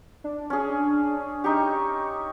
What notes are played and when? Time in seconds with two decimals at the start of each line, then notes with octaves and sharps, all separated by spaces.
0.24 D4
0.50 C#4 G#4
1.44 D#4 G4 C#6